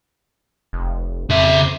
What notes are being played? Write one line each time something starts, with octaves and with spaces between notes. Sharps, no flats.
F1
F2 C#3 E5